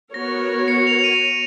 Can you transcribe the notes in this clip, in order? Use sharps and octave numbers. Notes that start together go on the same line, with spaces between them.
B3 F#4 A#4 C#5 A#6
C#7
F7
F7
D#7